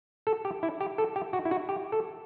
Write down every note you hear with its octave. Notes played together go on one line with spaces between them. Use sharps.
A4
G4
E4
G4
A4
G4
F#4
E4
F#4
G4
A4